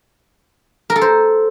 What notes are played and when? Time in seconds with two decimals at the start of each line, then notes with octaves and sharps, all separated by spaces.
0.90 A#4
0.96 A4
1.01 C5